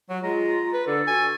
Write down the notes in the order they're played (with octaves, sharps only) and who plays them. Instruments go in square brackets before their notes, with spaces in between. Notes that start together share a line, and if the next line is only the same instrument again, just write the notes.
[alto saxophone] F#3 [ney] F#4
[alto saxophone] G#3 [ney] F4 [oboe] A#5
[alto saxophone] B4
[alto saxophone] D3 [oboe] A4
[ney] F#4 [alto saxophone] G#5